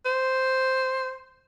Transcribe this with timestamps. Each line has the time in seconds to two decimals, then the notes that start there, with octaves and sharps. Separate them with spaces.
0.05 C5